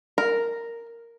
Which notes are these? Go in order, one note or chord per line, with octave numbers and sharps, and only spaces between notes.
A#4